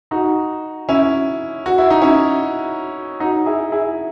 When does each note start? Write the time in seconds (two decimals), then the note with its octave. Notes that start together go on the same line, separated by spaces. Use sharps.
0.11 D#4 F#4
0.89 C#4 E4
1.66 F#4
1.78 E4
1.90 D#4
2.02 C#4 E4
3.20 D#4 F#4
3.46 E4 G#4
3.72 E4 G#4